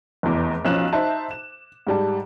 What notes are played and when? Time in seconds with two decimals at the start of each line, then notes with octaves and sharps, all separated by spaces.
0.23 F1 E2 D6
0.65 B1 F3 C#4 F5 F#6 E7
0.93 D#4 C5 E5 A5
1.31 E7
1.87 G#2 G3 A5